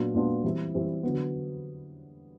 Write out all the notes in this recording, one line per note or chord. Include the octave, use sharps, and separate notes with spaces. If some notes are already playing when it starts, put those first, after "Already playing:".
Already playing: A#2 F#3 B3 D4 F4
A#2 F#3 B3 D4 F4
E3 G3 C4 E4
E3 G3 C4 E4
D3 F#3 B3